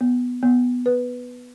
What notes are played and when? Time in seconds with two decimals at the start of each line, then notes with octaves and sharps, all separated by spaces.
0.01 B3
0.43 B3
0.86 B4